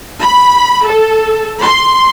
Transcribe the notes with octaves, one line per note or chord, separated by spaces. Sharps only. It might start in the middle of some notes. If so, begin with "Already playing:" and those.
B5
A4
C6